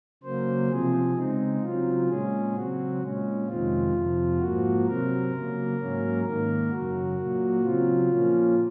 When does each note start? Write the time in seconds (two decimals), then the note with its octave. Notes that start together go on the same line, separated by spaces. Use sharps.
0.23 C#3 F#3 A#3 C5
0.70 C3 F3 C4 G#4
1.16 C#3 G#3 C4 D#4
1.61 C#3 F#3 C4 F4
2.08 A#2 G#3 C#4 G#4
2.54 C#3 F#3 C4 F#4
3.01 A#2 G#3 C#4
3.46 F2 C3 D#3 G#3 C4 F4
3.94 F2 C3 F3
4.39 G#2 F3 A#3 F#4
4.85 C3 F#3 C4 A#4
5.31 C#3 F#3 A#3
5.78 G#2 F#3 A#3 C#4
6.24 G#2 D#3 A#3 A#4
6.70 F#2 C#3 F#3 F#4
7.17 A#2 F#3 A#3
7.63 C#3 F#3 C4 F4
8.09 A#2 F3 A#3 C#4